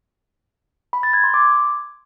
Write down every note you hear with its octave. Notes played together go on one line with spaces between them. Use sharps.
B5
A6
G#6
C6
D6